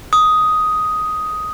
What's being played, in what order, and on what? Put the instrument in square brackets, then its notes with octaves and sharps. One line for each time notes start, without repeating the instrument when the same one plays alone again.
[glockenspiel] D#6